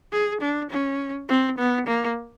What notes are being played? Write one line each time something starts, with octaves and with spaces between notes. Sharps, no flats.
G#4
D4
C#4
C4
B3
A#3